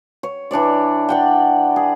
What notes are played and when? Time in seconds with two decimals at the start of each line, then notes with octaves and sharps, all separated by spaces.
0.23 C#5
0.51 E3 D4 C#5 D5
1.09 D5 F#5 G5
1.76 G#4